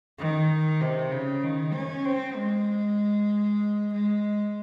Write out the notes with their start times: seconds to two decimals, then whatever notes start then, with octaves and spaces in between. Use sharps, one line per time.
0.19 D#3
0.81 C3
1.11 C#3
1.43 D#3
1.73 C#4
2.05 C4
2.37 G#3
3.92 G#3